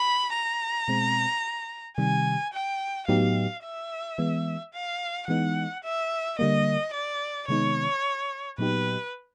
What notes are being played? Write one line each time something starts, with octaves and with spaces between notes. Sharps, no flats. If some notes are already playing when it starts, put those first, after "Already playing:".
Already playing: B5
A#5
B2 G#3 C4
C3 D#3 G3 G#5
G5
A2 F#3 B3 D#4 G4 F5
E5
E3 G#3 B3
F5
E3 G#3 B3 D#4 F#5
E5
D3 G3 A#3 D#5
D5
C3 D#3 G#3 B3 D#4 C#5
A#2 F#3 B3 D#4 G4 B4